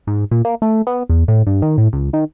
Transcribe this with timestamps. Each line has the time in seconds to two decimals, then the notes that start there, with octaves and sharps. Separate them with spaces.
0.07 G#2
0.31 A#2
0.45 A#3
0.62 A3
0.87 B3
1.09 E2
1.28 A2
1.47 G2
1.62 D#3
1.78 A2
1.93 C#2
2.13 D#3